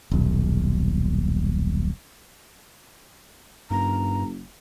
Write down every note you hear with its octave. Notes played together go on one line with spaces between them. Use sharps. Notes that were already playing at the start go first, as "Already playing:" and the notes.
D#1 B1
F#1 G2 A#5